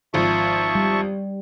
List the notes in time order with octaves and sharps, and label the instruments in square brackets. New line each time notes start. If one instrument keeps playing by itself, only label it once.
[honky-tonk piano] G#1 F3 [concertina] E5 A5 C#6
[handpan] G3